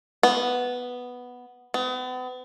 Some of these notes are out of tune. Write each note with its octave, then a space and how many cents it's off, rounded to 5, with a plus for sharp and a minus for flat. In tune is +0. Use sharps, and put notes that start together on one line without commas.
B3 +0
B3 +40